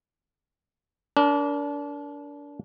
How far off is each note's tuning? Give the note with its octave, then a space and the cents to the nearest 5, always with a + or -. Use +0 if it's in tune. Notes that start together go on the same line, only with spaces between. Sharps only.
D4 -30 A#4 +15